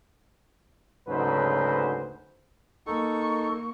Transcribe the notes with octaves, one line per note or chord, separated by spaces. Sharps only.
D2 G#2 C#3 F#3 B4 C5
A#3 D#4 A4 C#6